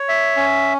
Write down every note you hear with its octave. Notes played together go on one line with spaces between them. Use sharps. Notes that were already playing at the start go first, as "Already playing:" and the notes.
Already playing: C#5
E5
C#4